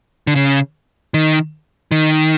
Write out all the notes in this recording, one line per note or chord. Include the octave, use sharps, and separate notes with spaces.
D3
C#3
D#3
D#3